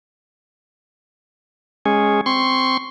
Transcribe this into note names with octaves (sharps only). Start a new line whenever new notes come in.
G#3 C#4 G#4
C4 C6 C#6